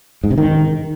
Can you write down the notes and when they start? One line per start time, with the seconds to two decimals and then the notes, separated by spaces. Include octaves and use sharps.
0.24 G#2
0.31 C3
0.38 D#3